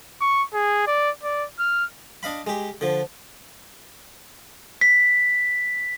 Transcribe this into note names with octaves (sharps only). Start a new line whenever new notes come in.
C#6
G#4
D5
D5
F6
D4 D#5 F5 B5
G#3 G4
D3 F3
B6